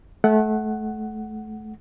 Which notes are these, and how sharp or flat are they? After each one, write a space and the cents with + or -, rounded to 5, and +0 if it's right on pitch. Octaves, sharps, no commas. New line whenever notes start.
A3 -25 F#5 +10